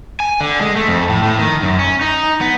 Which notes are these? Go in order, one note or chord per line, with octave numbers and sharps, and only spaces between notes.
G#5
D3
G#3
A3
F2
A2
A2
D#3
F#2
C#4
D#4
B3